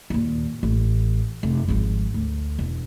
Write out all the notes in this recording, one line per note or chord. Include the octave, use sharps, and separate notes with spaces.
D#2 A#2
A1
F1
G#1 F3
D2
E1